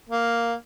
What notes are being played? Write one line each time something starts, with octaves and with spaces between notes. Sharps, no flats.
A#3